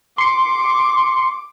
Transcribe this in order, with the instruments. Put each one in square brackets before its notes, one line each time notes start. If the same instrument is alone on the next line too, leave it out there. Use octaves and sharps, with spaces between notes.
[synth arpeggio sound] C6 C#7 [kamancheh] D6